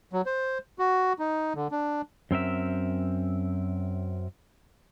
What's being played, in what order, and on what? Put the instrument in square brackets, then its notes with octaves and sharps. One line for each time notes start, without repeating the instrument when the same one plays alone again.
[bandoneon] F#3
C5
F#4
D#4
D3
D4
[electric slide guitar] F#2 C4 A#4 E5